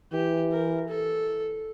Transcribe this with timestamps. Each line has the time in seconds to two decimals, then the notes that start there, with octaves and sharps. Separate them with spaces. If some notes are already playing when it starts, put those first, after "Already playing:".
0.12 E3 G4
0.51 A#4
0.89 A4